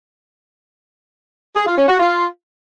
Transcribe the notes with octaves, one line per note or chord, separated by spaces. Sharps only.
G#4
F4
C#4
F#4
F4